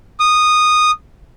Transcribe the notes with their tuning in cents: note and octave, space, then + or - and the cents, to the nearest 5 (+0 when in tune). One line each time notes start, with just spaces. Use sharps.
D#6 -10